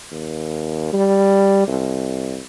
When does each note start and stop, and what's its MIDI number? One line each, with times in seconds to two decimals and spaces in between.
0.12 0.91 39
0.93 1.63 55
1.68 2.42 36